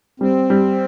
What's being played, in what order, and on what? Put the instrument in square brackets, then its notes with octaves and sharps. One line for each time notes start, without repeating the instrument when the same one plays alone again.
[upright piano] G3 [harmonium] C4
[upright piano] G3